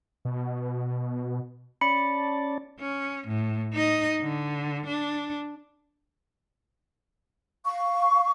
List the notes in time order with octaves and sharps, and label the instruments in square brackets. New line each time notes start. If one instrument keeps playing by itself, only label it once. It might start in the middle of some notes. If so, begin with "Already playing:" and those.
[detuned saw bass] B2
[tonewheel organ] C#4 D5 A5 [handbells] B5 C#7
[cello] C#4
A2
D#4 D#5
D3
D4
[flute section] F5 C#6